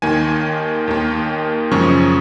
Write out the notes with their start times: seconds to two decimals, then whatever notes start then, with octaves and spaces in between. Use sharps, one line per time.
0.02 D#2 D#3 A#3 G#5
0.88 D#2 D#3 A#3
1.71 F#2 C#3 F3 G#3 C#4 C#6